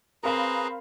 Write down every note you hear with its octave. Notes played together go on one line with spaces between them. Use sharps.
C4 G#4 A#4 B4 F5 A#5 B5